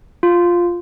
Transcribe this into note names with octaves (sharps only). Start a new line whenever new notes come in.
F4